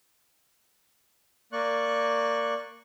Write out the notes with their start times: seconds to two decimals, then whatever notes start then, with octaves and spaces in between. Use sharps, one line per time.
1.52 A#3 D5 C#6 F#6